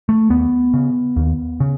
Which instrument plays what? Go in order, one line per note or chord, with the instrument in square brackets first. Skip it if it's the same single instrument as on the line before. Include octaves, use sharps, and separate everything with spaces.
[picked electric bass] A3
D#2 B3
C#3
D#2
C#3